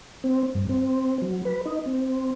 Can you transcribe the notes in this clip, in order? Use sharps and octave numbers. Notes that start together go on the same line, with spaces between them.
C4
G2
C4
F#3
B4
D#4
C4